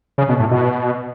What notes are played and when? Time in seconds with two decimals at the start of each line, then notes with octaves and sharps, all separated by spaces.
0.18 C#3
0.29 B2
0.40 A2
0.51 B2